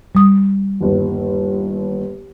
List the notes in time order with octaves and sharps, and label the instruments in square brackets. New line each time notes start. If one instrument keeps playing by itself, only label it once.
[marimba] G3 D#6
[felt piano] G1 D#2